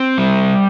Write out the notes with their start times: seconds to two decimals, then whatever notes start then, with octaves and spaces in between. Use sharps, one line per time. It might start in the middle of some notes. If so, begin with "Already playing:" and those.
Already playing: C4
0.18 G3